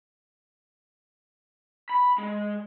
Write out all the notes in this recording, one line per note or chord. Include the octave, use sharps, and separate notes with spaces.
B5
G#3